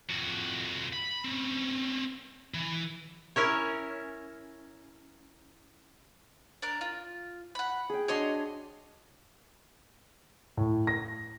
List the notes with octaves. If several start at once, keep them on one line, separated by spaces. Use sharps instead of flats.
F2 F#4
B5
C4 C#4
E3
C#4 E4 A#4 C#5
D4 A#4
F4
F#5 B5
G#4 G5
D4 F#4 C#5 D#5 C6
A2
A#6